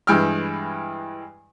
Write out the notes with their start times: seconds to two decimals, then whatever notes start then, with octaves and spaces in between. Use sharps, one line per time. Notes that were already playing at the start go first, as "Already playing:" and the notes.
0.07 G2 E3 G#3 G5 E6 F6